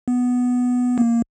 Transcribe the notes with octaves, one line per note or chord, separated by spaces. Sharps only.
B3
A#3